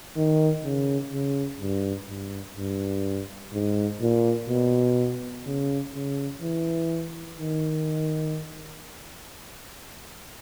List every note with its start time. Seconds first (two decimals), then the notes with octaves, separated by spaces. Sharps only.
0.16 D#3
0.64 C#3
1.13 C#3
1.60 G2
2.08 G2
2.57 G2
3.53 G#2
4.01 A#2
4.49 B2
5.46 C#3
5.94 C#3
6.42 E3
7.39 D#3